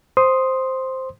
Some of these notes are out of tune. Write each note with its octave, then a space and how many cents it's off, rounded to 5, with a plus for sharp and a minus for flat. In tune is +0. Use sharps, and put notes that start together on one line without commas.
C5 +0 C6 +0 D#6 +0